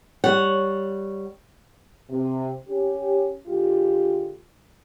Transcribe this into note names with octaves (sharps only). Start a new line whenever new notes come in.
G3 C#5 F#5
C3
C#4 G4
D3 G#3 F4 G4